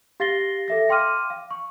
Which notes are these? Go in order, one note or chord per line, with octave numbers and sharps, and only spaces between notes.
G4 F5 A6 A#6 C7 G7
A4 E5 A#6
F5 G5 C6 D6 F6 D#7
F5
C#6